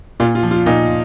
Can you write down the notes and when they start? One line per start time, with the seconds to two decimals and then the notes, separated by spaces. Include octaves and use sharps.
0.20 A#2 F4
0.35 F4
0.43 F3
0.51 F4
0.66 A#2 D#4